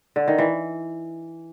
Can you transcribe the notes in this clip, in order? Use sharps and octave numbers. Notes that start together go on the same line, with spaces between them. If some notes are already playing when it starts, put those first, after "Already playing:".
D3
D#3
E3